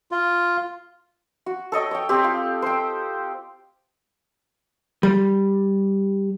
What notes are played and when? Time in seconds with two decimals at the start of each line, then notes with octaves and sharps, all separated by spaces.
0.11 F4
1.46 F#4
1.72 A4 C#5 D#5 G5
1.91 C#5 G5
2.09 C4 G4
2.24 F4
2.62 C5 G5
5.03 G3